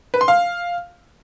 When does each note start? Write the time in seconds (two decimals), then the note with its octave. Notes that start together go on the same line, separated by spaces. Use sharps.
0.14 B4
0.21 C6
0.28 F5